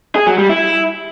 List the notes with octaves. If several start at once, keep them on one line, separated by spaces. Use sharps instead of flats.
G#4
F#3
G3
E4